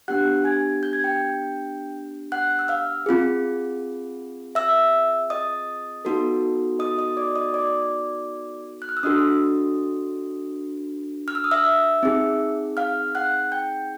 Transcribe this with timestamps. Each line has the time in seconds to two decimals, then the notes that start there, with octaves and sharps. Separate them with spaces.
0.08 B3 D4 G4 F#5 F#6
0.44 G#5 G#6
0.83 G6
0.93 G#6
1.04 G5 G6
2.32 F#5 F#6
2.59 E6
2.68 F5 F6
3.06 C4 F4 G#4
4.55 E5 E6
5.30 D#5 D#6
6.05 B3 D#4 F#4 A4
6.79 D#5 D#6
6.98 D#5 D#6
7.17 D5 D6
7.36 D#5 D#6
7.54 D5 D6
8.82 F#6
8.89 F6
8.97 E6
9.03 D4 F#4 A4 D#5 D#6
11.28 F6
11.35 E6
11.44 D#6
11.51 E5 E6
12.03 C4 D#4 G#4
12.77 F5 F6
13.15 F#5 F#6
13.52 G5 G6